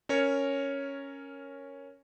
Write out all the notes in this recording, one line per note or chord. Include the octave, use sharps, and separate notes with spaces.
C#4 A#4 C#5